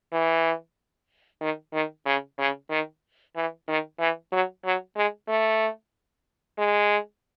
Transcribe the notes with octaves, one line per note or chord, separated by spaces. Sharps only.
E3
D#3
D#3
C#3
C#3
D#3
E3
D#3
E3
F#3
F#3
G#3
A3
G#3